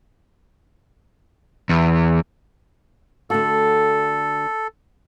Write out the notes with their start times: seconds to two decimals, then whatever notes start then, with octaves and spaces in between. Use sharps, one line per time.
1.69 E2
3.30 D3 A3 F#4 A4